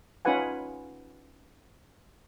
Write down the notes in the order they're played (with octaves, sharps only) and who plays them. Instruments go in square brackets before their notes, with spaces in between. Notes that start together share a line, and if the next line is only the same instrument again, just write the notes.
[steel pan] C#4 D#4 F4 B4 F#5 G#5